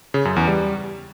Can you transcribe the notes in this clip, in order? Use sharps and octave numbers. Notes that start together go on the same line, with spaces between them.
C#3
F#2
E2
G3